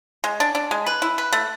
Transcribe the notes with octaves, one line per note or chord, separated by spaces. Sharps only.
G#3
D4
D4
G#3
B4
E4
B4
A3